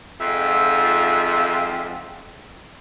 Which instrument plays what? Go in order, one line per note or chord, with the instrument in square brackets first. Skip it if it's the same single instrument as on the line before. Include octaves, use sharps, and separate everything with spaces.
[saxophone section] F2 G#2 F4 E5